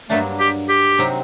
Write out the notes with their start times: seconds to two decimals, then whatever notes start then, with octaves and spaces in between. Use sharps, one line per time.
0.10 G2 F#3 A3 A#3 D4
0.40 G4
0.69 G4
0.98 C3 F#3 C4 D#4